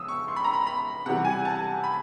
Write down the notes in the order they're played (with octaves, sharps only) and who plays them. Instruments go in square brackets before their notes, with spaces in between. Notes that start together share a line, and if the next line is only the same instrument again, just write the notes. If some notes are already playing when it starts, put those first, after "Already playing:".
Already playing: [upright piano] C#3 F3 D#6 E6
C#6
C6
B5
A#5
B5
B5
C3 E3 G3 F#5
G#5
A5
B5